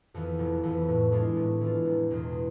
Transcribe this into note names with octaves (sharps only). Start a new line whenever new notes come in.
F2 E3 B3
F1
F2 E3 B3
A2
E3 G#3 D4 F4
A2
E3 G#3 D4 F4
F1
E2 B2 G#3